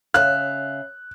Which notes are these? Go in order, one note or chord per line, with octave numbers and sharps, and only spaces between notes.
C#3 E5 F5 F#6